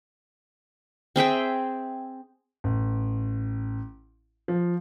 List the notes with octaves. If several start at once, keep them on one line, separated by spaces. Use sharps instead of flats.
C4 G#4 E5 G5
A1
F3